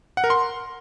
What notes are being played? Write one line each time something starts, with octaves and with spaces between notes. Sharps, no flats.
F#5
A#4
C6